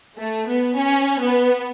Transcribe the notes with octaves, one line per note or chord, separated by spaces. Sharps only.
A3
B3
C#4
B3